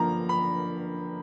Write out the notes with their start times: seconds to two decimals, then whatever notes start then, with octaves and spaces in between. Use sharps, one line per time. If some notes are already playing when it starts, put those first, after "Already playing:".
Already playing: G2 D3 F3 A#3 A#5
0.29 B5